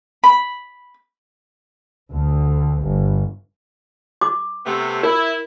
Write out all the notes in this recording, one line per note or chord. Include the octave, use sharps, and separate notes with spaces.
B5
D2
G1
D6
C3 A3 B3
E4 A#4